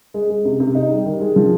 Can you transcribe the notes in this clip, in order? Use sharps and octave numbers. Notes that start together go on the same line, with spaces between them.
G#3
G#3
C3
C3
D#4
G3
D#3
G#3
F3